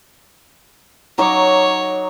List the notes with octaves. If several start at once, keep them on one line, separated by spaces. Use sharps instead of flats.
F#3 D#4 C#5 D6